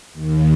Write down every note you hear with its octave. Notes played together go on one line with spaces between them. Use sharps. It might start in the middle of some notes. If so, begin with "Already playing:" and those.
D#2